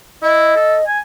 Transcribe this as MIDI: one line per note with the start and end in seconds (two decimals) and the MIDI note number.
0.23 0.55 64
0.23 0.84 75
0.56 0.77 69
0.87 0.99 80